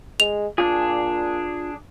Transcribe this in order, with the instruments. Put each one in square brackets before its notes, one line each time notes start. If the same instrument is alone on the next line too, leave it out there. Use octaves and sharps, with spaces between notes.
[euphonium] G#3 [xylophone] F7
[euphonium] A#2 [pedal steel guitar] D4 G#4 [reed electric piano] F4